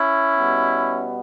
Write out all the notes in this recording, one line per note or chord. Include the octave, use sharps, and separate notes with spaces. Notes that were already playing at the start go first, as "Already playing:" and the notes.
Already playing: C#4 E4
B2 G3 B3